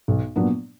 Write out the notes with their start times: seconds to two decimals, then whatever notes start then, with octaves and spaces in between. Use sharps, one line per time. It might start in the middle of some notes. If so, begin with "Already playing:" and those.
0.08 B1
0.36 A#2 F#3 B3 D4